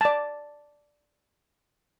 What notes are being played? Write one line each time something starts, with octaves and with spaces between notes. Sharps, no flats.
D5 A5